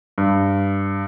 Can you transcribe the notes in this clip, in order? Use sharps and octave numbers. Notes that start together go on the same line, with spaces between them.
G2